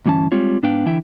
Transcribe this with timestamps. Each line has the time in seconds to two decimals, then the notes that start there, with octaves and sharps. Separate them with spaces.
0.06 D2 G2 E3 C#4 A5
0.32 G3 G#3 C4 F4 C#5
0.63 G#2 B3 D4 B4 F5 G5
0.86 D3 E3 E4 E5 G5